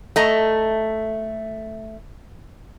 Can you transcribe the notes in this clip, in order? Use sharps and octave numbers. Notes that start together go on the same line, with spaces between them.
A3 D#5 A#5